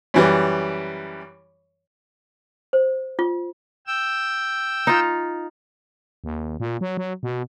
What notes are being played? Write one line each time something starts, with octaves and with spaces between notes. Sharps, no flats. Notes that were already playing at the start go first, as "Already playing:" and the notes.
F#2 E3 G3
C5
F4
G5 E6
D#4 F4
D#2
A#2
F#3
F#3
B2